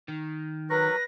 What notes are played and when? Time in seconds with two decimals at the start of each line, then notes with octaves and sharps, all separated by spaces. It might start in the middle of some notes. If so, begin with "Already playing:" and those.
0.08 D#3
0.70 F#3 A#4 B4 C#6 A#6